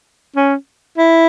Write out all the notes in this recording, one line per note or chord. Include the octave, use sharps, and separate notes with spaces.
C#4
E4